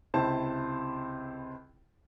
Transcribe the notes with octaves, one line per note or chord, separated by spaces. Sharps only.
C#2 C3 E4 C5 A5